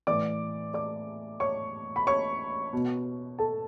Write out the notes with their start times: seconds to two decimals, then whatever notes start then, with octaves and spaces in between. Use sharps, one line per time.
0.07 A2 E3 D5 D6
0.74 D5 D6
1.40 C#5 C#6
1.96 B5
2.07 C#5 C#6
2.73 B2
3.39 A4 A5